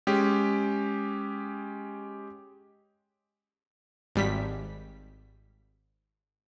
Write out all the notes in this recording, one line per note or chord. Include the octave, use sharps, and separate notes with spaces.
G#3 C#4 G4
G#1 G3 B6